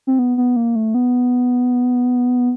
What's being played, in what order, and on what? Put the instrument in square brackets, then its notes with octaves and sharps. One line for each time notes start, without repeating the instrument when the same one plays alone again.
[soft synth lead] C4
B3
B3
A#3
A3
B3